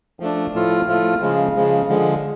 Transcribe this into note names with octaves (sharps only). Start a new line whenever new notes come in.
F3 A3 D4
A2 F3 A3 F4
A2 F3 A3 F4
C#3 F3 G#3
C#3 F3 G#3
D3 F3 G#3